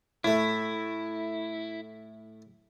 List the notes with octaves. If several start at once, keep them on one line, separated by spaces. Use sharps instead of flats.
A2 A3 E4